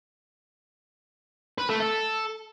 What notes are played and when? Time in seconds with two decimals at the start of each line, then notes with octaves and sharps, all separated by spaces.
1.58 B4
1.69 A3
1.80 A4